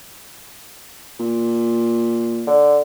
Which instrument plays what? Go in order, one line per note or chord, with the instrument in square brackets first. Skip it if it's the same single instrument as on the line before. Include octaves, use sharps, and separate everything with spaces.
[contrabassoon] A#2
[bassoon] D3